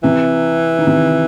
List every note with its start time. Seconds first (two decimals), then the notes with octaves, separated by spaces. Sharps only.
0.03 C3 E3
0.78 D#3
0.87 C3